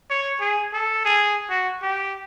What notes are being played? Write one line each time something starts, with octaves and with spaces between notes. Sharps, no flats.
C#5
G#4
A4
G#4
F#4
G4